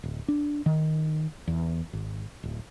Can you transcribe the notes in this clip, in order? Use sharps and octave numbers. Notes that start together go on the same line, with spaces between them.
D1
D4
D#3
E2
G#1
D1